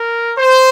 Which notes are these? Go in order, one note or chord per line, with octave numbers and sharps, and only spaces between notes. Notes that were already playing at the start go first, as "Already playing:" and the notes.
Already playing: A#4
C5